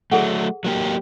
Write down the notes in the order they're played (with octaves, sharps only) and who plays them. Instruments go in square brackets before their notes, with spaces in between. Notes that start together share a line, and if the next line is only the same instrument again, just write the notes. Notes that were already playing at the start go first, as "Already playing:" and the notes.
[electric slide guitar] F#3 A3 [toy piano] G#4 A4 F#5
[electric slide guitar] F#3 A#3 G4